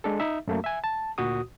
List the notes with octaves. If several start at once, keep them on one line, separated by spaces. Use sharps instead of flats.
G#3 D4 A4
D#4 E5
F#2 A3 A#3
E5 G#5
A5
D2 A#2 F#4 D#6